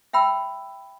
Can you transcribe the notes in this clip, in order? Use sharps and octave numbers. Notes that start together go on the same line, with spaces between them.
E5 G5 B5 E6